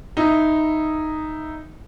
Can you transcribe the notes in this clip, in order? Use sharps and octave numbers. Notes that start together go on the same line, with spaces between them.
D#4 E4